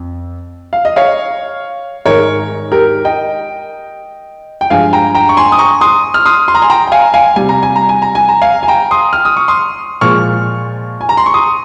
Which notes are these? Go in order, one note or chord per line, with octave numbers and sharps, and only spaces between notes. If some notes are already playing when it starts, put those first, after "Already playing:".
Already playing: F2
F5
D#5
C#5 F5
G#2 D#3 G#3 A#4 C#5
G4 A#4
D#5 G5
G5
G2 F3 G#3 F5 G#5
G5 A#5
G5 A#5
C#6
G#5 C6
D#6
A#5 C#6
C6 D#6
F6
C6 D#6
C6
A#5
G#5 C6
G5 A#5
G5
F5 G#5
F5 G#5
C3 G3 G#5
A#5
G#5
A#5
G#5
A#5
G#5
A#5
F5 G#5
G#5
G5 A#5
C6 D#6
F6
D#6
C#6
C6 D#6
A#2 F3 G#3 C#6 F6
G#5
A#5
C6
C#6
C6 D#6